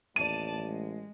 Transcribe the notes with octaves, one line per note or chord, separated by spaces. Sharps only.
A1 D#2 D5 A5 D#7
G#3